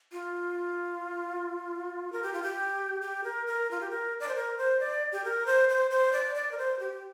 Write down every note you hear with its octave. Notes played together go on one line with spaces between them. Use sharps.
F4
A#4
G4
F4
G4
G4
A#4
A#4
F4
G4
A#4
D5
C5
A#4
C5
D5
G4
A#4
C5
C5
C5
D5
D5
A#4
C5
G4